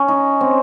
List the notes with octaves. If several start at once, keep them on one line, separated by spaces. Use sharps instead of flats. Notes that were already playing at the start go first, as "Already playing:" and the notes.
Already playing: C#4
D#4
C4